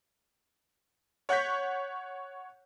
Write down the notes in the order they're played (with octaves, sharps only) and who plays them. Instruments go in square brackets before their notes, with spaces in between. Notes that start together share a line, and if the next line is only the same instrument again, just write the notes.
[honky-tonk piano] C#5 F#5 C#6 G6 B6